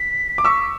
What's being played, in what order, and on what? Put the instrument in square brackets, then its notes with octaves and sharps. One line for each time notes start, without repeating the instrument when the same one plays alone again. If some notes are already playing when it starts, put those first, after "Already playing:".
Already playing: [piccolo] B6
[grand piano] D6
[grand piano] C#6 E6 [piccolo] B6